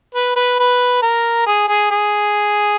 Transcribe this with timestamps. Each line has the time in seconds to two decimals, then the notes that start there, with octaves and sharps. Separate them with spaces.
0.15 B4
0.36 B4
0.59 B4
1.02 A#4
1.46 G#4
1.68 G#4
1.91 G#4